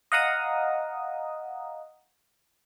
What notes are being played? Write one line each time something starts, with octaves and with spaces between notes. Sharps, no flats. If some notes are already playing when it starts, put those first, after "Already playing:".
D#5 F5 F#5 A#5 D#6